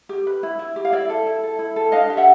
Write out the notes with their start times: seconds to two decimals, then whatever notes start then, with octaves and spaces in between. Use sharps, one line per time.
0.09 G4
0.27 B4
0.43 E4
0.59 E4
0.76 G4
0.85 F5
0.92 E4 D5 E5
1.09 A4
1.26 E4
1.43 A4
1.59 E4
1.76 A4
1.92 D4 D#5 F5
2.10 G4
2.17 E5 F#5